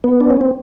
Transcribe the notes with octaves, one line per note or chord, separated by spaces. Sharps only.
B3
D4
C#4
C4